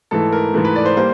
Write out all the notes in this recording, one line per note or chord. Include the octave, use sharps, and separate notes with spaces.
G#2 E3 A3 A4
A#4
G#2 E3 A3
B4
D5
C5
G3 A#3 C5